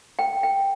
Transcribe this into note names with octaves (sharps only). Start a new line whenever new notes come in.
G5
G5